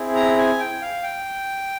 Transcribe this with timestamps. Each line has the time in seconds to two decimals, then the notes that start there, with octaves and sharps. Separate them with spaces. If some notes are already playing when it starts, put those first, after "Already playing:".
Already playing: C4 E4 G#4
0.15 A#5
0.38 G#5
0.60 G5
0.82 F5
1.03 G5